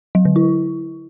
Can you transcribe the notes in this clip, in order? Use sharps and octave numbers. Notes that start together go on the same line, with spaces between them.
F#3
D3
E4